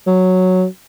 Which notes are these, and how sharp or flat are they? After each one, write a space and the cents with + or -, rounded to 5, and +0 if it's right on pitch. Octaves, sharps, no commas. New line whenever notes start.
F#3 -5